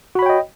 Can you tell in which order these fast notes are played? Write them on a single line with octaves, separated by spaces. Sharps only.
F#4 B5 C#5 G5 D#5